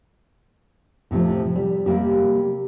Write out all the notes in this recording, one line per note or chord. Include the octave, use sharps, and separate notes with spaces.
A2 C3 D#3 F3
G3
C3 G3 A#3 G4